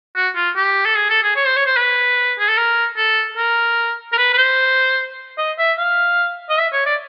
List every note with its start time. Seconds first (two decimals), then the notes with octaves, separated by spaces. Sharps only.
0.16 F#4
0.36 F4
0.56 G4
0.85 A4
0.96 G#4
1.10 A4
1.23 G#4
1.36 C#5
1.46 C5
1.56 C#5
1.66 C5
1.77 B4
2.39 G#4
2.48 A4
2.57 A#4
2.97 A4
3.37 A#4
4.13 A#4
4.18 B4
4.33 B4
4.38 C5
5.38 D#5
5.58 E5
5.79 F5
6.50 D#5
6.58 E5
6.73 C#5
6.86 D5